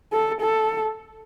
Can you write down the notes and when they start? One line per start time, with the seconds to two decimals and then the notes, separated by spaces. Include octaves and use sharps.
0.12 A4
0.41 A4